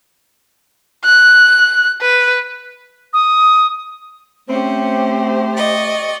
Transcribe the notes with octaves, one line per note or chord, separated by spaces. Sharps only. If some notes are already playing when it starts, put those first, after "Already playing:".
F#6
B4
D#6
A3 C4 C#4 G4 C5
D5 D#5 C#6